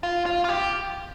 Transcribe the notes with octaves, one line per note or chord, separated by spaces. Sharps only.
F4
F4
F4
G4